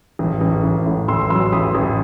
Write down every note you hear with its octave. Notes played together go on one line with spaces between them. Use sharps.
A1
A1
A1
A2
A1 C6 E6
F#3 C6 E6
A1 B5 D#6
A1